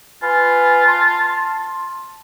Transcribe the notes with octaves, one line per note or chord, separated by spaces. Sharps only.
F4 B4 G#5
A5 C6